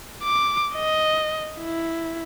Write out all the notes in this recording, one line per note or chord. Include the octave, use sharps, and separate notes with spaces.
D6
D#5
E4